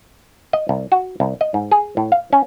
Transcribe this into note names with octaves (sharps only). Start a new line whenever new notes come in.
D#5
C2
F#4
C2
D#5
G#2
G#4
A2
F5
C#4